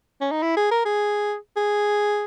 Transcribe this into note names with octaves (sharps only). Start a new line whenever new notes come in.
C#4
D#4
E4
G#4
A#4
G#4
G#4